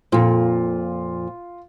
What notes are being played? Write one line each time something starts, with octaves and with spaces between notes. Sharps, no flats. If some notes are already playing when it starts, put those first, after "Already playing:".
F2 A#2 F4